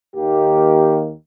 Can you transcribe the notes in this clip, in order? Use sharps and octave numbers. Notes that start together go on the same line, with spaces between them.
D#2 D#3 A#3 G4